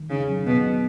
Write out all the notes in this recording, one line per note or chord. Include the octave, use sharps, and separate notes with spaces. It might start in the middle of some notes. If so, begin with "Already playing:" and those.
Already playing: D#3
C#3 D#4
F#3
B2 B3
F#3